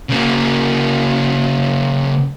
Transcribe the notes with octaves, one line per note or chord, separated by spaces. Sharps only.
C#3 A#3